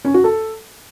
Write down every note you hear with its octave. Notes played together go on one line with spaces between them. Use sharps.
C#4
F#4
A4